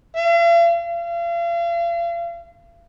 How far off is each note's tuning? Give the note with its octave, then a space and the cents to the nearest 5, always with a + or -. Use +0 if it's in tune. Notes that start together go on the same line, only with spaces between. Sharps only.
F5 -45
F5 -40